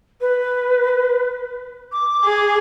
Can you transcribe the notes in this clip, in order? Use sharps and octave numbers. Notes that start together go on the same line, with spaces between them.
B4
D6
G#4